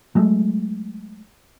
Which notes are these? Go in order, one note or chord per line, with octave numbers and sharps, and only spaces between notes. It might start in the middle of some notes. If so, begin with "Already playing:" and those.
F#3 G#3 A3